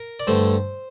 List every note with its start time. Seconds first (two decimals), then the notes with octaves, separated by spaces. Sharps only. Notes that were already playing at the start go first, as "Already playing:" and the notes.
Already playing: A#4
0.20 D5
0.27 G2 D3 A3 C5